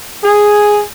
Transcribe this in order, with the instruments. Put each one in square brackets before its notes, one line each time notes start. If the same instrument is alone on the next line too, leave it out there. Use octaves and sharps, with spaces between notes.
[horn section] G#4